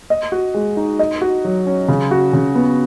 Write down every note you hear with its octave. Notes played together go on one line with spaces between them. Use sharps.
D#5
F#4
G#3
D#4
D#5
F#4
F#3
C#4
C#3
F#4
C#3
B3